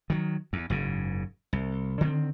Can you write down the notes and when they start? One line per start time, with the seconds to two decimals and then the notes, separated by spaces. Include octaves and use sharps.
0.10 D#3 F#3
0.53 E2
0.70 F#1 G#2 C#3
1.53 C2
2.01 D3 D#3 G#3 C4